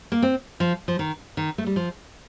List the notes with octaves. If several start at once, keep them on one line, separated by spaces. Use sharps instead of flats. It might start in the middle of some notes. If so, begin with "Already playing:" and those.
A#3
C4
F3
F3
D#3
D#3
A3
G3
F3